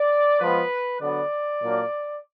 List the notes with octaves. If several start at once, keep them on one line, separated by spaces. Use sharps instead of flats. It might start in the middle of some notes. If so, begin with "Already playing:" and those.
Already playing: D5
F3 G#3 B3 B4
D3 F#3 B3 D4 D5
A#2 F#3 A#3 D4